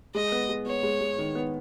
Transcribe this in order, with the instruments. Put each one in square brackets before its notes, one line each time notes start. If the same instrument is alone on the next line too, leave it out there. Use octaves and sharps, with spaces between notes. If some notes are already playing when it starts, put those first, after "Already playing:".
[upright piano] G#3 [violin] D#5
[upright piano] B3
G#3
[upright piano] B3 [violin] C#5
[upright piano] G#3
G#3
D#3
B3